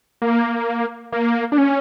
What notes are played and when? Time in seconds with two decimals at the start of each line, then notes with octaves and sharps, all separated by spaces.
0.22 A#3
1.12 A#3
1.52 D4
1.58 C#4